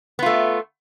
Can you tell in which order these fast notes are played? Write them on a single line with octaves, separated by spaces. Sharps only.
B3 F4 A3